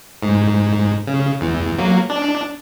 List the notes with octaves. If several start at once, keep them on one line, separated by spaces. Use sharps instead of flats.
G#2
C#3
E2
F#3 A#3
D4